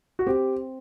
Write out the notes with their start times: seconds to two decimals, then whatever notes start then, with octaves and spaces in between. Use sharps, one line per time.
0.19 F#4
0.26 C4 G4